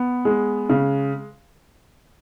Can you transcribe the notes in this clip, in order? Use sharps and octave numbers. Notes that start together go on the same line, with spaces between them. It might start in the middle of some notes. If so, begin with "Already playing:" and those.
Already playing: B3
G#3
C#3